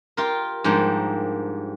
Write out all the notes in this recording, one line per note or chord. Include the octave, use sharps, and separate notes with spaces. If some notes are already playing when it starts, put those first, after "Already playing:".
F4 G4 A#4
G#2 F3 G3 A#3 D4